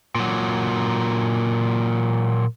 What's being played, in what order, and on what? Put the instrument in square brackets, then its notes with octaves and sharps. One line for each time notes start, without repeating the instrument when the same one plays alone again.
[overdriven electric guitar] A#2 F#3